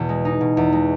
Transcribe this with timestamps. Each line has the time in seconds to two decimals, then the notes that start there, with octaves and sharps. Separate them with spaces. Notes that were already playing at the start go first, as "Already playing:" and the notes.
Already playing: E2 B2
0.09 G#3
0.25 D#4
0.41 B2
0.57 E2
0.73 G#3